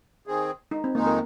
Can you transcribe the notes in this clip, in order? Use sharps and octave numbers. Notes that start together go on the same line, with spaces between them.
D#3 C4 G#4
D#4
C4
F2 D#3 G#3 A#3 D#4
A#4